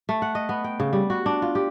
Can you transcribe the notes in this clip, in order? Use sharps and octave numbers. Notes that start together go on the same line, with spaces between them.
A3
F#5
D#5
B3
G5
C#3
G3
F#4
D4
F4
G4